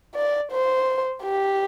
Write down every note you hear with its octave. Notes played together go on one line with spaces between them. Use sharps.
D5
C5
G4